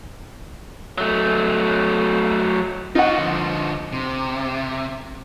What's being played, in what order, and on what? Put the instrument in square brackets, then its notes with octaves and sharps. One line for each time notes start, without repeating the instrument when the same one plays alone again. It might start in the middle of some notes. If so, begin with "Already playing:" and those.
[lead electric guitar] F#3 A3
[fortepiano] D#4 F#5 [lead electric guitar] F4 F#4
[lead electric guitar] D3 F3
C3